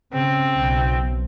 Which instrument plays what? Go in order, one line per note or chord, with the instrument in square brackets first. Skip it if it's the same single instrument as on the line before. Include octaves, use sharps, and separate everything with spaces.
[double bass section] C#3 [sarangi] C4
[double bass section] B1